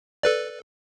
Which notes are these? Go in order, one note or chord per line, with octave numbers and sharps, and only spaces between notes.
A4 B4 D5